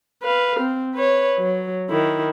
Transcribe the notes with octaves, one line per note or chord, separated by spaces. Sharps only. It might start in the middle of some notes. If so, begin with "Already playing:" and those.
B4 F5
C4
B4 C#5
F#3
D#3 E4